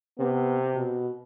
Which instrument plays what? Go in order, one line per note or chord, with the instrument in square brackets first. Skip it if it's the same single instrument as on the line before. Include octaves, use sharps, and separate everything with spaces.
[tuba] C3 [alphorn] B3
[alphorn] B2